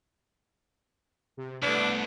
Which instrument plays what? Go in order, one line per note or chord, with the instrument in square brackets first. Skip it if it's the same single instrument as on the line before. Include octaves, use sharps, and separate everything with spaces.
[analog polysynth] C3
[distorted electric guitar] C2 [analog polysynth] A3 B3 B4 [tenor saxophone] D4